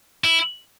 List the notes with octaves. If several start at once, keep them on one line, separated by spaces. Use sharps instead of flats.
E4